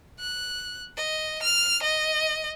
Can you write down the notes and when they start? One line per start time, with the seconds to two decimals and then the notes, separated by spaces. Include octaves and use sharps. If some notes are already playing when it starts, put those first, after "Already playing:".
0.20 F#6
0.97 D#5
1.43 F6
1.83 D#5